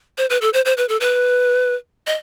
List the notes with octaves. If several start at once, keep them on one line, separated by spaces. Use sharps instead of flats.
C5
B4
A4
C5
C5
B4
A4
B4
D#5